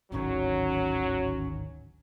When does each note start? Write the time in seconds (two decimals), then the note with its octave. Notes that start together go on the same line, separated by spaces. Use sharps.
0.12 D1 G#1 D#3 F#3 C#4